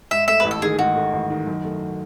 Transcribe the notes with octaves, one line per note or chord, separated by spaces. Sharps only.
G#2 E5
A3 E5
A1 B4
A4
D#3 G#4
G#2 F#4
A3
A1
D#3
F#2
A3